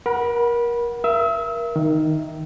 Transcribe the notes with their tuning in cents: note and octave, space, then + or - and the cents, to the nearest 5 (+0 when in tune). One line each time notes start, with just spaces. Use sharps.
A#4 +25 F#5 +0 B5 -20
A#4 +20 E5 +30 E6 -40
D#3 +0 E5 +0